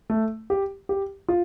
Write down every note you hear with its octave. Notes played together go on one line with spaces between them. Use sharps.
A3
G4
G4
F4